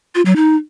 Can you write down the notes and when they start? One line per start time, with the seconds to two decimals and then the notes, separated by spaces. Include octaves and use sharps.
0.15 F4
0.26 F#3
0.36 D#4